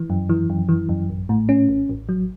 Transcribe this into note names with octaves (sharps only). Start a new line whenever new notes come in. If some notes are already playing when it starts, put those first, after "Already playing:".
Already playing: E3
F#2
E3
F#2
E3
F#2
A1
A2
C#4
A1
A1
F#3